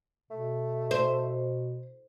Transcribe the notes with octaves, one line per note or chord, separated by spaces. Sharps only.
B2 A3
C5